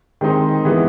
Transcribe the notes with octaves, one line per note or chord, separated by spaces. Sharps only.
D#3 G#3 C4 D#4
E3 G#3 B3